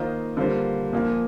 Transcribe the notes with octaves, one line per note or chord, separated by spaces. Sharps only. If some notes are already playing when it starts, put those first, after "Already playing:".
Already playing: D#3 A#3 F4 C5 D#5
D3 G3 A#3 F4 C5
A#2 F3 A#3